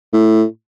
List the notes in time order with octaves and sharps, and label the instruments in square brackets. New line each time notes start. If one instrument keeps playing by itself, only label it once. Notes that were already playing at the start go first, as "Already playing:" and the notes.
[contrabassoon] A2